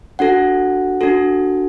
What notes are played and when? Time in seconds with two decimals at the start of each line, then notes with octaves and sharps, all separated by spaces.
0.19 D4 F#4 A4 F#5
1.01 D4 F#4 A4